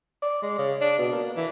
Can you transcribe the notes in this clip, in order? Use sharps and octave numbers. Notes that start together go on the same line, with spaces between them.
D5
G#3
C#3
D4
B2
A#3
E3